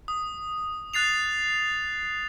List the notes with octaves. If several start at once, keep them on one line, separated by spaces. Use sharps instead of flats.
D#6
F#6 A6 C7 F7